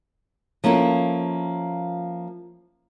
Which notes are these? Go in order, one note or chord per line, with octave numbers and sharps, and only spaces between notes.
F3 A#3 C#4 E4 A4